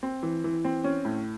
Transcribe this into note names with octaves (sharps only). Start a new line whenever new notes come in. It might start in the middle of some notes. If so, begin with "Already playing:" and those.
C4
E3
E3
C4
C#4
A2